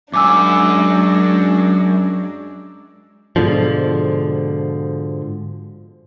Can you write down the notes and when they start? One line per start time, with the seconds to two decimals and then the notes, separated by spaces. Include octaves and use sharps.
0.13 F#2 G#3 D4 G#5 D6 E6
3.36 G#2 B2 D3 F3